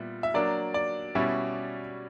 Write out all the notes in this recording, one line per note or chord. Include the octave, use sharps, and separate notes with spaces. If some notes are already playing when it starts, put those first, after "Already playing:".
Already playing: A#2 G3 B3 E4
E5
F#3 A#3 D4 D5
D5
B2 G3 C#4 E4